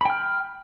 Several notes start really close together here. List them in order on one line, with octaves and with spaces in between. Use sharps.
B5 G5 F6